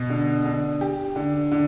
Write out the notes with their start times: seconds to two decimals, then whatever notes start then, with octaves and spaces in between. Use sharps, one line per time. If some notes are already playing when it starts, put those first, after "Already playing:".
Already playing: B2
0.10 D3
0.45 D3
0.81 G4
1.16 D3
1.52 D3